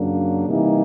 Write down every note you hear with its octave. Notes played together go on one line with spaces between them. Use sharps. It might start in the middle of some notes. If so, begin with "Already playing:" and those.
Already playing: F#2 C#3 F#3 A#3 D4
C3 E3 G3 A#3 D#4